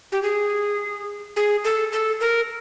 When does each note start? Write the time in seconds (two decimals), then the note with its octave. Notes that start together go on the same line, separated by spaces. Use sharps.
0.12 G4
0.23 G#4
1.36 G#4
1.65 A4
1.93 A4
2.20 A#4